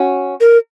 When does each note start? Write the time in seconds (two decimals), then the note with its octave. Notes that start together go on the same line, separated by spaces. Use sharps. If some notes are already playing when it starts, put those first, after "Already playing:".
Already playing: C#4 F#4
0.41 A#4